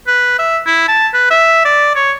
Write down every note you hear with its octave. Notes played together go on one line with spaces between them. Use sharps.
B4
E5
E4
A5
B4
E5
D5
C#5